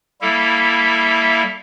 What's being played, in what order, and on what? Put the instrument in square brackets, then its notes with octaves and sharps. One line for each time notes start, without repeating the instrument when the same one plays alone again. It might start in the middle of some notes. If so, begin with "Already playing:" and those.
[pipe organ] G3 A#3 E4 A4 E5